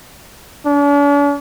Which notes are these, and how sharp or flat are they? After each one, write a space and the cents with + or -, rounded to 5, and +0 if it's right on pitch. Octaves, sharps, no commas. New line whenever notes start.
D4 -45